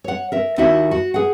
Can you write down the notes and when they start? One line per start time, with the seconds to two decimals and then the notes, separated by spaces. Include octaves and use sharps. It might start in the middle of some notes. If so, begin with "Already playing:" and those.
0.04 C#5 F#5
0.32 A#4 E5
0.58 D#2 D#4 E4 F#4 E5
0.91 F#4
1.14 G#4 F#5